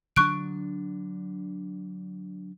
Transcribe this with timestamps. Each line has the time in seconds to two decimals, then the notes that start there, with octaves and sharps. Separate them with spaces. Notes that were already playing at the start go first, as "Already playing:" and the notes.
0.16 D3 F#3 D4 C#6 F#6 D7